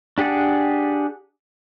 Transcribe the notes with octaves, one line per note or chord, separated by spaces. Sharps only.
D4 G4 G#4 F#5 A5